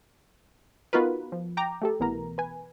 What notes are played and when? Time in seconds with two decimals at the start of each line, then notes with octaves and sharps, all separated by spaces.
0.93 B3 D#4 F4 F#4 A#4 B4
1.32 F3
1.57 G5 A#5 D6
1.82 A3 G4 A4
2.00 C2 B2 E3 B3 A#4 A#5
2.38 B4 G#5